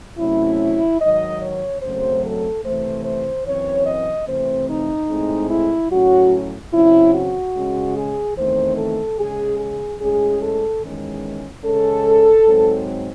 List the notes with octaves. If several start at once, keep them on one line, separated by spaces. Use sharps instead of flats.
C3 F#3 A3 C#4 E4
G#2 D#3 F#3 D#5
C#5
F#2 C#3 F#3 A3 C4 C5
A4
C3 E3 A3 C5
C5
F#2 E3 C4 C#5
D#5
C3 E3 A3 C4 C5
D#4
A2 G#3 C4
E4
A2 F#3 C#4 F#4
C#3 F#3 C4 E4
F#4
C#3 G#3 C#4
G#4
E2 D#3 A3 C4 C5
A4
C#3 G#3 C#4 G#4
G#4
A2 G#3 C#4 G#4
A4
E2 D#3 G#3 C#4
C#3 G#3 C#4 A4
G#2 F#3 C4